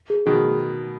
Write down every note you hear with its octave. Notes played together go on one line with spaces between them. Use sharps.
G#4
B2 D#3 G#4